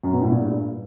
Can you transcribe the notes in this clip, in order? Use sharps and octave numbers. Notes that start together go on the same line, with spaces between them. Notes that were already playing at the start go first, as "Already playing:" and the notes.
F#2
B2
A2
A#2
G2